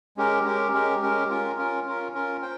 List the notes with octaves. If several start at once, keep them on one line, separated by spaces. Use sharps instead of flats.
G#3 C#4 G4 A#4
G#3 C#4 G4 A#4
G#3 C#4 G4 A#4
G#3 C#4 G4 A#4
C#4 F4 A#4
C#4 F4 A#4
C#4 F4 A#4
C#4 F4 A#4
C5 G5